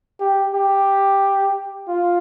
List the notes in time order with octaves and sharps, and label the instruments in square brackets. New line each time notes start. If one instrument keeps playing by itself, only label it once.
[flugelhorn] G4
G4
F4